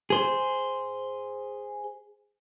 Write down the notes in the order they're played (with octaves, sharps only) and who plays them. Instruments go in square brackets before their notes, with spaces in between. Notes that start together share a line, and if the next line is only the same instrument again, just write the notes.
[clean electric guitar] G#4 C5